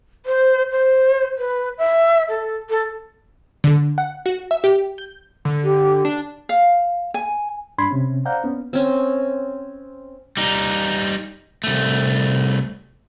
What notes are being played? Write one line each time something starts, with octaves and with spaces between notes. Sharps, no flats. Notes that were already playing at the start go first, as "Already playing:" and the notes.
C5
C5
B4
E5
A4
A4
D3
F#5
F#4
E5
G4
G6
D3
G4
D4
F5
G#5
G2 D4 B5 C6 G#6
C3 C#4
C5 D5 F5 F#5 A#5 G6
B3 C#4
C4 C#4
G3 D#4
C2 A3